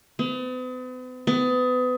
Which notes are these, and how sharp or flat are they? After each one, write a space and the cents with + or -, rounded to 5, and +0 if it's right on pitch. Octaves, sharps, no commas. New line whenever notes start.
B3 +45
B3 +30